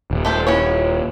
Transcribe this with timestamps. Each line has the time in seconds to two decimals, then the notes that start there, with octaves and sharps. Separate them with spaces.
0.11 D#1
0.25 A3 A4 C5
0.47 C#4 E4 C#5